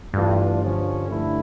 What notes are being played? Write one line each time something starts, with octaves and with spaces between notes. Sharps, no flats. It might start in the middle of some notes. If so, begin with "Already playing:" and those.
G2 E3 A3 D4 F4
D3 F3 C#4
D3 A3 E4